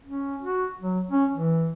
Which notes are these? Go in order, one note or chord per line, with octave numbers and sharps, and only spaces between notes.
C#4
F#4
F#3
C#4
E3